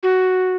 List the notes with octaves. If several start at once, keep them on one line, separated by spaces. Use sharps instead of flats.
F#4